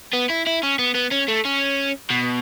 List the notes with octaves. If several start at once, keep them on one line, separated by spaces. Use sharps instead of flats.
B3
E4
E4
C#4
B3
B3
C#4
A3
C#4
B2